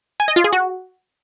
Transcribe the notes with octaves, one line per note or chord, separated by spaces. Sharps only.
G#5
D#5
F4
G#4
F#4